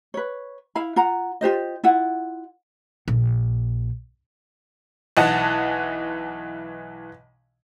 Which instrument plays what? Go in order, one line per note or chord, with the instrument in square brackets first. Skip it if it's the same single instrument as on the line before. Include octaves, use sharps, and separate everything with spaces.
[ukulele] B4 C#5
E4 F5 B5
F4 F#5 A#5
F4 G4 C5 D#5
E4 F4 F#5
[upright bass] A#1
[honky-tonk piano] B1 E3 D#5 F#5 A5